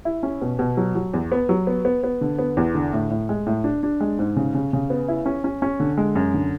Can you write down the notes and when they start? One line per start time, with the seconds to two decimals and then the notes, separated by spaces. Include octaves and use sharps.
0.05 E4
0.23 C#4
0.41 B2
0.59 B2
0.77 F#3
0.95 F#3
1.14 E2
1.32 B3
1.49 F#3
1.67 B3
1.85 B3
2.04 B3
2.21 D3
2.39 B3
2.57 E2
2.75 D3
2.93 A2
3.10 A2
3.29 G#3
3.46 A2
3.64 D4
3.83 D4
4.01 G#3
4.19 G#2
4.36 C#3
4.54 C#3
4.73 C#3
4.90 B3
5.08 E4
5.26 C#4
5.44 C#4
5.62 C#4
5.80 D3
5.98 G#3
6.15 F#2
6.34 D3